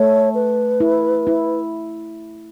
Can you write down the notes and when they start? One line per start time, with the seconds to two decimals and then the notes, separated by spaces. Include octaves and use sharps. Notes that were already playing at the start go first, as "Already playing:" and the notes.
Already playing: A3 C#5
0.35 B4
0.80 E4
1.27 E4